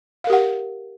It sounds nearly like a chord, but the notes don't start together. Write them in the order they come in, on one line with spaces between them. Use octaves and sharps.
F5 A#4 G4 F#5